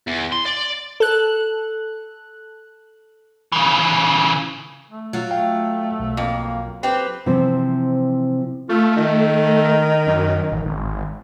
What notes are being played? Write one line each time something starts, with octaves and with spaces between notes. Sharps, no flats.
E2
C6
D5
A4 F#6
C#3 E3
A3
F#3 F4
A3 F5 G5
B1
F2 A#3
C4 G4 B4
C3 E3 F3 C4 C5
A3 F4
D#3
F#2
A1
G#1